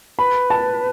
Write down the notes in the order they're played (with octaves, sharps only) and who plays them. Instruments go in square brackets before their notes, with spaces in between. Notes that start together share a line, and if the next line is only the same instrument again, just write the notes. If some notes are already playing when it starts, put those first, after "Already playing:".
[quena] B4 [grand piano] B5
[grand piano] A5